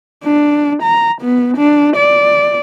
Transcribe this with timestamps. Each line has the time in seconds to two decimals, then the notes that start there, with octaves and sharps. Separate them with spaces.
0.24 D4
0.83 A#5
1.22 B3
1.57 D4
1.96 D5